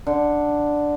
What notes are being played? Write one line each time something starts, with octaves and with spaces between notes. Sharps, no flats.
D3